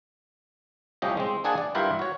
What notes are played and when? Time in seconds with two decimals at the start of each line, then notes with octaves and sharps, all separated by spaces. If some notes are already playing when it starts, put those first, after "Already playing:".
1.02 C2 A2 F3 C#4 G4 D#5
1.17 G#3 C4
1.44 A#3 D4 G#4 F#5 G#5 A5
1.58 D5
1.75 G2 E4 F4 A#4 F#5 G5
1.99 F#4 C#5